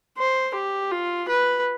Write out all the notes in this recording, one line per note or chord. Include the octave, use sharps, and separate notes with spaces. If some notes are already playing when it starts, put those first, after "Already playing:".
C5
G4
F4
B4